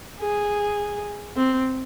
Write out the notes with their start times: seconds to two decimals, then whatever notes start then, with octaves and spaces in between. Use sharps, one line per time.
0.20 G#4
1.37 C4